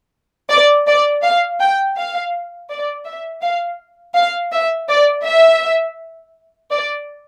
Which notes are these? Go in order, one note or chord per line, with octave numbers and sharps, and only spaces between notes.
D5
D5
F5
G5
F5
D5
E5
F5
F5
E5
D5
E5
D5